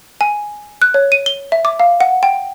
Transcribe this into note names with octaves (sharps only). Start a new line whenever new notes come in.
G#5
F#6
C#5
D#7
G7
E5
D6
F5
F#5
G5